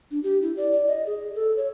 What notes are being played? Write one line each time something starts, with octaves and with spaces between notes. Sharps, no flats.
D4
G4
E4
D5
D5
D#5
G#4
A4
C#5